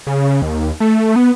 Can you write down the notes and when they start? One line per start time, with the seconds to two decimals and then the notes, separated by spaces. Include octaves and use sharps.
0.07 C#3
0.42 D#2
0.80 A3
1.16 B3